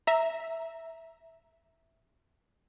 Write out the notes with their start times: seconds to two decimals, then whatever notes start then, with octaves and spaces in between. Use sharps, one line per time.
0.07 E5 A#5